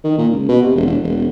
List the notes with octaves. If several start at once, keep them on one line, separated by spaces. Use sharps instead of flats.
D#3
A#2
C#2
B2
C3
E1
E1
E1
E1